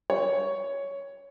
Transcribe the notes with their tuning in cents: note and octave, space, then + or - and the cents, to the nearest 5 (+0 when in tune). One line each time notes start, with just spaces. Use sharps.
C#5 +10